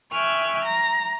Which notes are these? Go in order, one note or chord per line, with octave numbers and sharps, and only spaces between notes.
E5 G5 G#5 C#6 F6 F#6
A#5